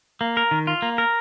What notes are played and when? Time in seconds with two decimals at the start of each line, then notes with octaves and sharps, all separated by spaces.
0.21 A#3
0.37 A#4
0.51 D#3
0.67 F4
0.82 A#3
0.98 A#4